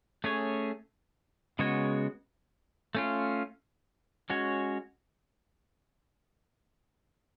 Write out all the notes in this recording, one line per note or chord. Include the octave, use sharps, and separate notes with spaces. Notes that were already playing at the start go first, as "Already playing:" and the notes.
A3 C#4 G#4 C#5
C#3 G#3 B3 F#4 C#5
A3 C#4 F4
G#3 C#4 F#4 C#5